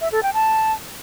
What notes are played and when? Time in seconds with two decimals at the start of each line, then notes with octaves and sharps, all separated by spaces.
0.01 E5
0.12 A4
0.23 G5
0.34 A5